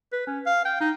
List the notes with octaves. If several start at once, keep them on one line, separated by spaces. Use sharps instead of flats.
B4
C#4
F5
G5
D#4